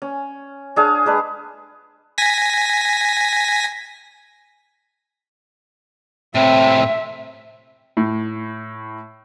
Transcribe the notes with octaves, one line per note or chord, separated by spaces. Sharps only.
C#4
D4 G#4 F5
G#3 D4 B4
G#5 A#6 B6
A2 C3 C4 E5
A2